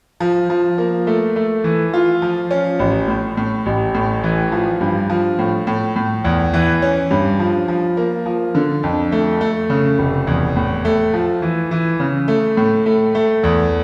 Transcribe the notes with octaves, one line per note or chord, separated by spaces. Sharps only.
F3
F3
A#3
A3
A3
E3
F4
F3
C#4
A1
A2
A2
A1
A2
E3
F3
G2
F3
A2
A2
A2
E2
E3
C#4
G2
F3
F3
A#3
F3
D3
F2
A3
A3
C#3
F1
E2
A2
A3
F3
E3
E3
C#3
A3
A2
A3
A3
E2